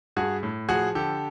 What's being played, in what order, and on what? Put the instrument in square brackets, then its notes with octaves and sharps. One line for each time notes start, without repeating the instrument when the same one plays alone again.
[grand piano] G2 F#4 G#4
A2
F3 F#4 G#4
D3 G4 A4